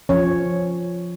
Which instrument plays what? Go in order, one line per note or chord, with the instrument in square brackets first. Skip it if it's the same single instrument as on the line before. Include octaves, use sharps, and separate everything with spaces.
[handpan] F3 C#4 C#5